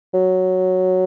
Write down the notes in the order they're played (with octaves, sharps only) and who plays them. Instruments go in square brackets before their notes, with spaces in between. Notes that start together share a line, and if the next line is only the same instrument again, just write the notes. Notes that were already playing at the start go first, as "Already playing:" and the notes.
[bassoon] F#3